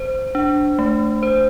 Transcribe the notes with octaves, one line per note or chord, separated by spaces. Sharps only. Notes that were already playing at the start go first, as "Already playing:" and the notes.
Already playing: C5
D4
A3
C5